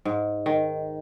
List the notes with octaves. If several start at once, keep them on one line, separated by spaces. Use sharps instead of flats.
G#2
D#3